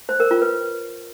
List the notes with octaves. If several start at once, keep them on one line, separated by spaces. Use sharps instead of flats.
C5
A#4
F4
B4